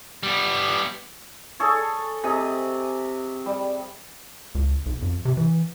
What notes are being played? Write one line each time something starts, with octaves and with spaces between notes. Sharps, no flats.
G3 B3
G#4 A4 C#5
C3 G#4 D#5
G3
C#2
B1
F2
C3
E3